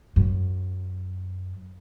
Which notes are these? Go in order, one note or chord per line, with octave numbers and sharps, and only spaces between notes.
F#2